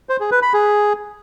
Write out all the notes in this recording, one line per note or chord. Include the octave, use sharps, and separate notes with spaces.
C5
G#4
B4
B5
G#4